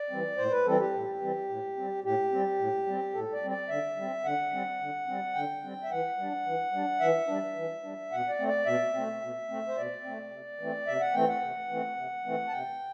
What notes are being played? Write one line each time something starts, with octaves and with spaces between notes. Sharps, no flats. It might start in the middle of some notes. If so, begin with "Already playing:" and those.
Already playing: D5
E3 G3 C4
A2 C5
B4
E3 G3 C4 A4
G4
A2
E3 G3 C4
A2
G3 C4
A2 G4
G3 C4
A2
G3 C4
A2 A4
D5
G3 C4
D5
D3 E5
G3
C4
D3 F#5
G3 C4
D3
G3 C4
D3 G5
G3 C4
E5
E3 F#5
G3 D4
E3
G3 D4
E3 E5
G3 D4
E3
G3 D4
B2 F#5
D5
A3 C4
D5
B2 E5
A3 C4
B2
A3 C4
C5
B2 D5
A3 C4
C3
E3 A3 C4
C3 E5
F#5
E3 A3 C4 G5
F#5
C3
E3 A3 C4
C3
E3 A3 C4
A5
C3 G5